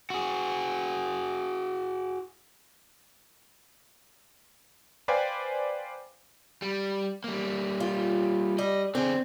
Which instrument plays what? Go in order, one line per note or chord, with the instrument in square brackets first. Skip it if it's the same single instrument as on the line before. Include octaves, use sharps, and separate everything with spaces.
[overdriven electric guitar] F#4 G#4
[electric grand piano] B4 C5 D5 F5 G5 G#5
[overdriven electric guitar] G3
G3 A#3
[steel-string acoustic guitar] F4
[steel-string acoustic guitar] G3 [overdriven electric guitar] D#5
[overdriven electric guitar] D3 G#4 [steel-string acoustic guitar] C4